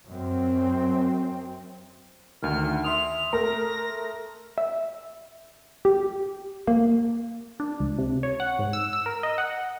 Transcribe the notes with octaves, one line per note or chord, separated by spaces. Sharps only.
F#2 C4
D2 D#3 F6
E5 C6 D#6 F7
A3 A#4 A#6
E5
G4
A#3
D4
C#2
C3
C#5
F#5
G#2
E6
E6
A#4
D#5
F#5